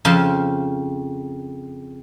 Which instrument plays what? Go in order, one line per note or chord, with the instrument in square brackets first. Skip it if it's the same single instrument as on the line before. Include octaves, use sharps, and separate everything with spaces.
[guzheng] F2 C#3 C5 F5 A5 C6